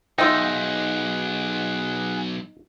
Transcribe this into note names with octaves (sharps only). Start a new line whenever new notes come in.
B1 D#4 F4 G#4 E5 F#5 G5